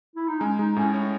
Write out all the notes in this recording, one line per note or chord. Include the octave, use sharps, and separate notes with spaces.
E4
D#4
G#3 C#4
G#3 D#4
A2 C#4
C#4